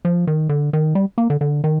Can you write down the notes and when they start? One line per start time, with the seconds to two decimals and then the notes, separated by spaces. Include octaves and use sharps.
0.05 F3
0.27 D#3
0.49 D3
0.73 D#3
0.95 G3
1.18 A#3
1.30 D3
1.41 D3
1.64 D#3